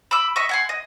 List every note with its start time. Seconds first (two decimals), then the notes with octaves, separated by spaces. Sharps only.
0.11 B5 D6 E6
0.36 D#5 E5 C#6
0.49 F#5 G#5 C6
0.69 D#5